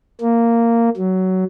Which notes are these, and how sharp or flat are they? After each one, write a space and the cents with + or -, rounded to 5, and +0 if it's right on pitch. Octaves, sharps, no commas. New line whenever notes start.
A#3 -10
F#3 +15